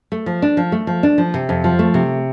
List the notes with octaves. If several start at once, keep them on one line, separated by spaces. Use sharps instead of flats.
A3
F3
D4
F3
A3
F3
D4
F3
C3
F2
F3
A3
C3